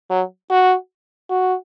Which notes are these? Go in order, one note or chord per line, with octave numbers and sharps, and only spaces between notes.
F#3
F#4
F#4